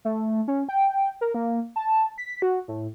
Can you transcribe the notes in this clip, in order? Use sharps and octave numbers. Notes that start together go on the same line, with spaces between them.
A3
C#4
G5
A#4
A#3
A5
B6
F#4
A2